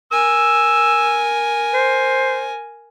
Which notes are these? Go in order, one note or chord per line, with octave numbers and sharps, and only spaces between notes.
A#4 G#5 E6
C5